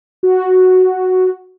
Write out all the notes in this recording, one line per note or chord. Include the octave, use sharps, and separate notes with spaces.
F#4